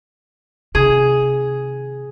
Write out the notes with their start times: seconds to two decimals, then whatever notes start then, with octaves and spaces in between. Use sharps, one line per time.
0.75 C3 D#3 G#4